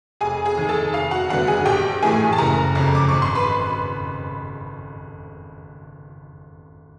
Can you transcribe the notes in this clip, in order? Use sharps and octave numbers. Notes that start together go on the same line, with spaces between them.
F1 G#4 G#5
G#4 G#5
D#2 D#3
A4 A5
F1 F5
F#4 F#5
D#2 D3 G3 B3 F#4 F#5
G#4 G#5
A#1 G4 G5
A2 E3 A3 G#4 G#5
A5
F#1 A#4 A#5
F2 C#3
D6
G#1 C#6
C6
B4 B5